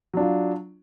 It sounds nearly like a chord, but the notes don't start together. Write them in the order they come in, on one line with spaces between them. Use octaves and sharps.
F#3 D4 F4